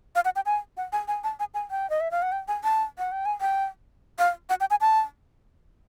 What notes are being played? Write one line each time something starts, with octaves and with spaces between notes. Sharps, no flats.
F5
F#5
G5
G#5
F#5
G#5
G#5
A5
G#5
G#5
G5
D#5
E5
F5
F#5
G5
G#5
A5
F#5
G5
G#5
G5
F5
F#5
G5
G#5
A5